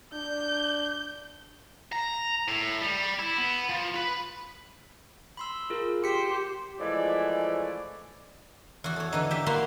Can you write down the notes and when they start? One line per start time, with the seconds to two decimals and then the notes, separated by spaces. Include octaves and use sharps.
0.14 D4 G6
1.92 A#5
2.48 A2
2.81 G3
3.19 E4
3.38 B3
3.70 F3
3.96 B4
5.37 B5 C6 E6
5.70 F4 G#4 A#4
6.04 G4 C5 B6 C#7
6.80 E3 F3 G#3 A3 D5
8.84 E2 F#4
8.96 A4 C#5
9.13 D3 E3 D#4
9.31 G4 E5 G5
9.46 A#3 E4 F#4 E5 A#5 C6